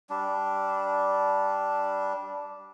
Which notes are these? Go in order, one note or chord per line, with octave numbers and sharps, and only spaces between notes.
G3 D4